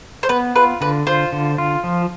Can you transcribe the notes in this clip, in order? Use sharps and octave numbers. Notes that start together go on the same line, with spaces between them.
C5
B3 B4
F4 B4
D3 B4
F4 C5
D3
F4
F3